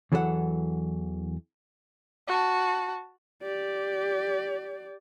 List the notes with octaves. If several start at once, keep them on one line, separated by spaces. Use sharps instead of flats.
E2 E3 F#3 A4 C5 F#5
F#4 A5
G4 D5